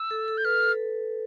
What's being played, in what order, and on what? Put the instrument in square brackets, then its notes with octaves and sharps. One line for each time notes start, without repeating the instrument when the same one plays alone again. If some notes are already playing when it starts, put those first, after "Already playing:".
Already playing: [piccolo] E6
[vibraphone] A4
A4
[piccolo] G6
[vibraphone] B4 [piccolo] F6
[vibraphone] A4